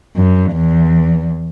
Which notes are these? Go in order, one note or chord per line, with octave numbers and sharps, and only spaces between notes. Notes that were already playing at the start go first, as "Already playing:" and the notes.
F#2
E2